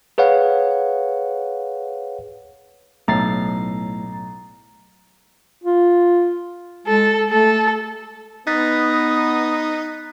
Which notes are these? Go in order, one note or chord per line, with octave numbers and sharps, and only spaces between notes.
G#4 B4 C#5 F5 F#5
B1 A2 A#5 A6 C7
F4
G#3 A4
A3 A4
B3 D#4 D#6 F#6 A6 B6